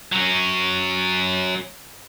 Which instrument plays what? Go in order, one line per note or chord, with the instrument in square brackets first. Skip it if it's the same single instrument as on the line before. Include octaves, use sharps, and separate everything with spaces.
[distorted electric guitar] F#3 C#4